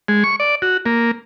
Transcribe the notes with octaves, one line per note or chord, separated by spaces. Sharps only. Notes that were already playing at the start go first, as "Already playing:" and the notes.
G#3
C#6
D5
F#4
A#3